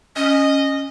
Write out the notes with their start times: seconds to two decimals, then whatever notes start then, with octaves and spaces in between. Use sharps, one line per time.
0.16 C#4 D#5